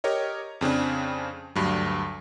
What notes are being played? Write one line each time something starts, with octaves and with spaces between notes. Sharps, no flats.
G4 A#4 C#5 D#5
F2 C#3 C4 D4
D2 G2 F#3